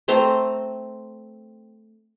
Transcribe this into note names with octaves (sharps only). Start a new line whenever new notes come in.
A3 C4 C5 A#5